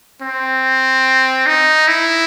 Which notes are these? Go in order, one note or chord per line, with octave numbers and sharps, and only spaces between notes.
C4
D#4
E4